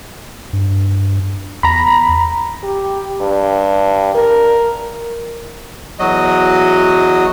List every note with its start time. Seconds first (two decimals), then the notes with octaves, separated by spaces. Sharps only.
0.53 G2
1.63 E2 A#5 B5
2.63 G4
3.21 G2
4.14 A#4
5.99 E2 F#3 F#4 D#5